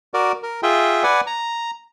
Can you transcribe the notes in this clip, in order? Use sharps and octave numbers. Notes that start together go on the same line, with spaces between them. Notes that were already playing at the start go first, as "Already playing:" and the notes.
F#4 A#4 D5
A#4
F4 G#4 E5 G5
B4 D5 F#5 G#5
A#5